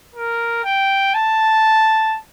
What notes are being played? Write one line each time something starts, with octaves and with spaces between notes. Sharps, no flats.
A#4
G5
A5